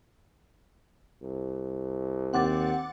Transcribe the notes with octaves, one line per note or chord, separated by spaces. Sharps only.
C2
D#2 C4 F#5 D6 A6